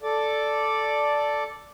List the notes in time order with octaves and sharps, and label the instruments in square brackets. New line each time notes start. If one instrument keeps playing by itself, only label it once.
[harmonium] A4 D5